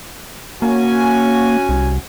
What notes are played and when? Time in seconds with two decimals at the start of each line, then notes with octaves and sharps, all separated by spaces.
0.62 A#3 C#4 F#4 G#5
1.69 C2